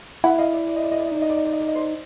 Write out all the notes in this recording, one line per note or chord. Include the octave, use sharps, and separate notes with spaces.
E4 E5 F#5
D#5 F5
D5 E5
D5
D#5
D5
D#5
D5
D#5
D#4 D5
D#5
D5
D#5
D5
D#5
D5
D#5
C5 D5